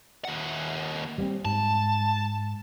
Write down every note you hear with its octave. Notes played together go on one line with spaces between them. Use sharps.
D#2 F#5
G3 B3 C4
G#2 A5